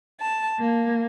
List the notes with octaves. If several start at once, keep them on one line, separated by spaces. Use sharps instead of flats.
A5
A#3